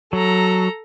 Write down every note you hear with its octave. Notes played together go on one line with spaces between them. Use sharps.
F#3 A4 A#5